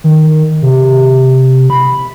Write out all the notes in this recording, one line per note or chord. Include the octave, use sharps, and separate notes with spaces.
D#3
C3
B5